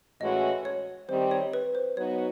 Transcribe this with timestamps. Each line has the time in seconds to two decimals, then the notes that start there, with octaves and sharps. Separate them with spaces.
0.20 A2 E3 G#3 C#4 F#4 D#5
0.65 C#5
1.09 D#3 G3 C4 D#4 G4 C5
1.31 C#5
1.53 B4
1.75 C5
1.97 F#3 B3 D#4 F#4 C#5